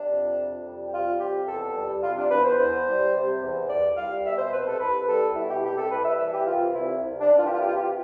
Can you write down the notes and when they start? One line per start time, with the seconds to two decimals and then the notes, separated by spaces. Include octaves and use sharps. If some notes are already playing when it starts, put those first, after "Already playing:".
Already playing: C3 D4
0.10 F2
0.38 F2
0.65 G3
0.89 G4
0.92 C3 F4
1.20 F2 G4
1.48 E2 A4
1.75 G3
2.03 C3 F4
2.18 D4
2.31 E2 B4
2.45 C5
2.59 E2
2.87 G3
3.14 C3
3.43 E2
3.70 C2 D5
3.97 G3 F5
4.26 B2 E5
4.39 C5
4.53 C2 B4
4.67 A4
4.80 C2 B4
5.08 G3 A4
5.35 B2 E4
5.50 G4
5.64 C2 G4
5.77 A4
5.91 C2 B4
6.05 E5
6.19 E3 E5
6.32 G4
6.47 C3 F4
6.74 C2 E4
7.02 C2
7.21 D4
7.29 E3
7.39 F4
7.47 G4
7.53 F4
7.57 C3 G4
7.68 F4
7.76 G4
7.83 F4